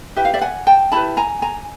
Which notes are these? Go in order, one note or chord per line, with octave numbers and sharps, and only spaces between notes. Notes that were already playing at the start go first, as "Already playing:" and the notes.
E4 G4 B4 E5
F5
D5 E5
F#5 G#5
G5 A5
E4 G4 B4 A5 B5
G#5 A#5
G#5 A#5